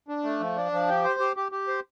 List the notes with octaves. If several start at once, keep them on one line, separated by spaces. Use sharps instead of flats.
D4
A3
F3
D4
F3
G4
C5
G4
G4
G4
C5